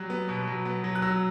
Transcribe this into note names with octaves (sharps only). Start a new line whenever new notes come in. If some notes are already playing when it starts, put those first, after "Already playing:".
Already playing: F#3 G3 F#6
B3
B2
F#3
B3
F#3
F#6
F#3 E6